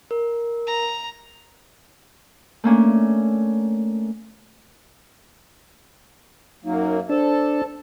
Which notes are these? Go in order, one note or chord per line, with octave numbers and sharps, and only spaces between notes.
A#4
A#5
A3 A#3 C#4 D4
F#2 F#3 A#3 D#4
D4 A4 C5 A5